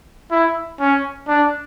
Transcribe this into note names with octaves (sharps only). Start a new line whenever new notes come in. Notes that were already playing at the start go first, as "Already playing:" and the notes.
E4
C#4
D4